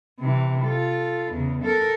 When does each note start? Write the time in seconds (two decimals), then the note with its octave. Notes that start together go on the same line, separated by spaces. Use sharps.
0.20 C3 E3
0.64 F4 A4
1.33 E2 C#3
1.63 A4 A#4